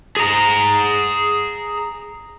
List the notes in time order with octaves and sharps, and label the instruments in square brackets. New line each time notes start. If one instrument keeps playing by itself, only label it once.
[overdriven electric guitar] G#4 A#5